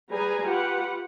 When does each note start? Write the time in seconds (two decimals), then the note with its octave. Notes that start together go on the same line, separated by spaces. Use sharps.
0.10 G3 G#4 B4 G#5 A#5
0.43 F4 G4 B4 F#5